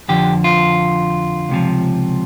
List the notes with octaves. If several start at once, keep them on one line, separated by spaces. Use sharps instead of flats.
F2 D3 F3 G4
F4
C#2 C3 F3